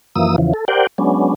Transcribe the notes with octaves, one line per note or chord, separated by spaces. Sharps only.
F#2 E3 F3 A#3 D#6 E6
E2 C#3 E3 F3
A4
G4 A#4 C5 D5 F#5 G5
F#3 G#3 B3 C#4 D4